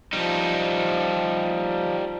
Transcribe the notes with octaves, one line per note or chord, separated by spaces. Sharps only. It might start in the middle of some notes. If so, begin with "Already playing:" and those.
F3 G3 D#4